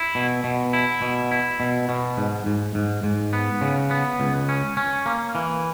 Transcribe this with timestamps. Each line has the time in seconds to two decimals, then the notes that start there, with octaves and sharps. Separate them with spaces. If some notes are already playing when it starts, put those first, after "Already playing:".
Already playing: E4
0.15 B2
0.44 B2
0.73 E4
1.02 B2
1.31 E4
1.60 B2
1.89 B2
2.17 G#2
2.46 G#2
2.75 G#2
3.03 G#2
3.33 B3
3.61 C#3
3.91 B3
4.20 C#2
4.49 C#4
4.77 C#4
5.06 A#3
5.35 E3